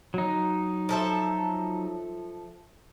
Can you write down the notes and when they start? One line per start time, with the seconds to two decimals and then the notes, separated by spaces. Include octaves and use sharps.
0.14 F#3 D#4
0.89 F3 A4 E5